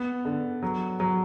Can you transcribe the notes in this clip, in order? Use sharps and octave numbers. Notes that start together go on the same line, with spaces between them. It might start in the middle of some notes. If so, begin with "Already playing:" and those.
Already playing: B3
D3
F#3
F#3